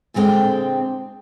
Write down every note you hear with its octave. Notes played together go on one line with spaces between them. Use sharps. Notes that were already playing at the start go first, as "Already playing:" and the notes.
A#2 D3 G#3 C4 A4 G5